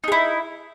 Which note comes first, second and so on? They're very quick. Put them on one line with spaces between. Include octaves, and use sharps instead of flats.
D#4 G#4 E4